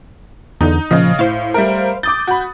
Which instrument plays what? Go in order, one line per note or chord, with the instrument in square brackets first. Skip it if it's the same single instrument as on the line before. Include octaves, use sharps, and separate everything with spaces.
[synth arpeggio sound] E2 D3 [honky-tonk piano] D#4
[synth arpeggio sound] A#2 F3 [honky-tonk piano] C#3 D#5
[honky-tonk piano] A2 [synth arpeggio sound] C5 F5
[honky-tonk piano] G3 A3 A#4
[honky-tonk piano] D6 D#6 A6 [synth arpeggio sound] G6
[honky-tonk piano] F#4 B5